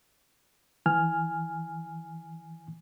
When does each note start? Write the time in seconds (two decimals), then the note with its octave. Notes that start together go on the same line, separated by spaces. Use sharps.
0.86 E3 G#5 F6